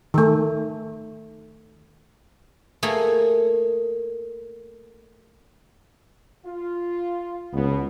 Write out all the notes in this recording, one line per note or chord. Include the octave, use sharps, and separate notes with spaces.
D#3 A3
A3 A#3 G#4 A4
F4
C#2 B2 B3